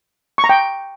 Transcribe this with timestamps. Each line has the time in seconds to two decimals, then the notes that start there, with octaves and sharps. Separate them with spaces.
0.38 C#6
0.44 A#5
0.49 G5